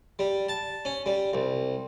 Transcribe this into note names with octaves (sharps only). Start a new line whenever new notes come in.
G3
A5
C#4
G3
C2